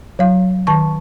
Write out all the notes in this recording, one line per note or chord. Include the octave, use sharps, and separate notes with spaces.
F#3 F5
D#3 A5 C#6